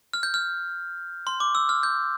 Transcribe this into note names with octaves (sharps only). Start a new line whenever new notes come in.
F6
G6
F6
C6
D6
E6
F6
G6